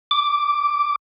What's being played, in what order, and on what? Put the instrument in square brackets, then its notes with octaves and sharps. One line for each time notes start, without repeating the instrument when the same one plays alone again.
[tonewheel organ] D6